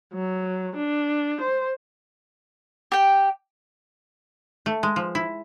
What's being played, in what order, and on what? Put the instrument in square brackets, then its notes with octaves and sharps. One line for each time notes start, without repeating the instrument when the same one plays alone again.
[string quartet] F#3
D4
C5
[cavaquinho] G4 G5
[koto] A3
G#3
F3
E4